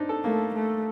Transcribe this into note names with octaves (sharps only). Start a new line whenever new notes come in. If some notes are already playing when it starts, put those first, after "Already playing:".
Already playing: C4 D4 D#4
A4
A3 A#3
A3